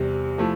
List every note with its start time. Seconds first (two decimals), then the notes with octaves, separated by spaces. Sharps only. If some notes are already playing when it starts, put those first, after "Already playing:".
Already playing: E2 C3 G3
0.38 F3 A3 E4